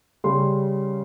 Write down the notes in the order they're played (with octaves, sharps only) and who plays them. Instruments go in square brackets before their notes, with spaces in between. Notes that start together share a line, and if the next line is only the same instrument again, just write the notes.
[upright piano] C#3 G3 C#4 C6